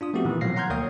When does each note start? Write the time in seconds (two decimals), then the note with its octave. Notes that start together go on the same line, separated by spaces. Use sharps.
0.01 D4 F4 D#6
0.14 F3 A3 B3 C4 F#4 G4
0.25 A#2 D#3 E3
0.41 B2 F3 F#3 F5 A#6 C7
0.56 F#5 A#5 C6 F6 G6 G#6
0.70 D2 A#3 C#5 G5 D#6